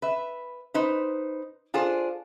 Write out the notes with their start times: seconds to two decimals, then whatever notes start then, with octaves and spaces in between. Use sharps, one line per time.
0.02 B4 E5
0.74 D#4 B4 C5
1.74 D4 F4 G#4 A4 C5